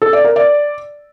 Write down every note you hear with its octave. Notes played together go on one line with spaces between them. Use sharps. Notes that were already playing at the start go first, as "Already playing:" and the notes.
A4
D5
A#4
D5